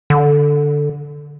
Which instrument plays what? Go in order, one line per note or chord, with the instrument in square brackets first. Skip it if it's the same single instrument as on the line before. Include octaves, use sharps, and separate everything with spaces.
[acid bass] D3